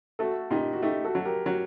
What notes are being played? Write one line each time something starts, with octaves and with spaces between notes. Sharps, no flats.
A3 F#4 A4
A#2 D#4 G4
F#4
A3 D#4 G4
F#4 A4
F#3
G4 A#4
F#3